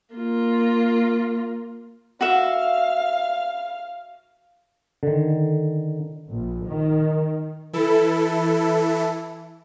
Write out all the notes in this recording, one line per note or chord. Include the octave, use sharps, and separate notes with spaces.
A#3 F4
F#4 E5 F5
D3 D#3
A#1
D#3
E3 E4 A4